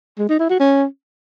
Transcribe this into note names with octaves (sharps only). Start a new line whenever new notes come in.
G#3
D#4
E4
F#4
C#4